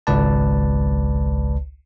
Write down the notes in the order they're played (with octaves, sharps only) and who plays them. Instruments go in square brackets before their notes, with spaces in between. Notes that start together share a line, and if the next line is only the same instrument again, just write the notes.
[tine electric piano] G#1 C#2 B4 D5 A5